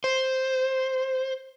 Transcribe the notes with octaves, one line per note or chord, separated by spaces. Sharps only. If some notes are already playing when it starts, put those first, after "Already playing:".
C5